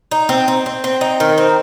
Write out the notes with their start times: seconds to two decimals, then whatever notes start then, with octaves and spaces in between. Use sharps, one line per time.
0.11 D#4
0.29 C4
0.48 C4
0.66 C4
0.84 C4
1.01 D#4
1.20 D#3
1.38 C4